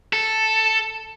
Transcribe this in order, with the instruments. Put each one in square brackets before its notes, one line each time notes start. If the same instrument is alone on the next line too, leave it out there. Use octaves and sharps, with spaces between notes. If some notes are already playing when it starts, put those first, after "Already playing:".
[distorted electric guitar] A4